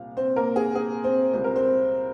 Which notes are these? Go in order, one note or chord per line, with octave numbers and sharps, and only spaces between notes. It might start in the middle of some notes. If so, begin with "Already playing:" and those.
Already playing: C2 A#2 F3 F5
C4 C5
A#3 A#4
G#4
G#4
C4 C5
C#2 C3 G3 C5
A#4
C4 C5